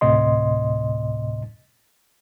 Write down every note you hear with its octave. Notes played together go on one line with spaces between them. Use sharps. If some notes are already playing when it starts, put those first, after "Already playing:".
D2 A2 C3 D#5 C6